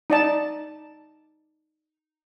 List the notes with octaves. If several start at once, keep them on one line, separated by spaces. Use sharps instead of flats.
D#4 D5 A5